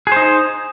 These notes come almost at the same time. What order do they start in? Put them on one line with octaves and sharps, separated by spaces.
G#4 C5 D#4